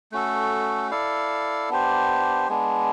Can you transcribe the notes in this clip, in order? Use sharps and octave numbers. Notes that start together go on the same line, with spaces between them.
A3 C#4 F#4 A4
E4 A4 D5 F5
B3 D4 G4 C5
G#3 B3 D4